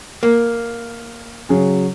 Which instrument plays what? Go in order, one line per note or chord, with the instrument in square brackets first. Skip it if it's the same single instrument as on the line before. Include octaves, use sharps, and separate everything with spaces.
[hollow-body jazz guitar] A#3
[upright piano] C#3 F#3 G#4